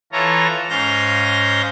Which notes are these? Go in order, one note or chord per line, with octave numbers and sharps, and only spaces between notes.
E3 F4 A4 C#5 A#5
G#2 C#4 F5 G6 A#6